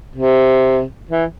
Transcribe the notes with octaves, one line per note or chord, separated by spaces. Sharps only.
C3
E3